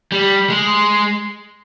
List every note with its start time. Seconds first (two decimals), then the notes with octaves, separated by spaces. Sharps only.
0.12 G3
0.50 G#3